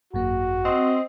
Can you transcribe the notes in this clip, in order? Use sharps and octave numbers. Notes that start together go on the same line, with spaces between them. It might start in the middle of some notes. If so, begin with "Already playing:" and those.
G#1 F#2 A#3 F#4
C4 D#5